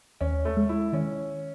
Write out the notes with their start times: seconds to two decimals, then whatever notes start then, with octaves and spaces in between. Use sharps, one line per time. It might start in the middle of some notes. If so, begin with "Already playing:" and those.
0.21 D#2 C#4
0.45 A3
0.57 G#3
0.69 E4
0.93 D#3 C#4